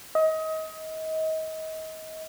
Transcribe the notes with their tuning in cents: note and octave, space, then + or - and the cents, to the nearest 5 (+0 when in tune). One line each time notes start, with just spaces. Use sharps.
D#5 +30